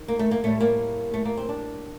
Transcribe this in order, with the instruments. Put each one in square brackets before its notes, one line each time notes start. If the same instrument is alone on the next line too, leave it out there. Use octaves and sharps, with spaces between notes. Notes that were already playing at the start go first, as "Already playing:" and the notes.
Already playing: [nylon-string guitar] D#2 D#3 G3
A#3
A3
A#3
A2 G3 A3
A#3
A3
A#3
C4
D4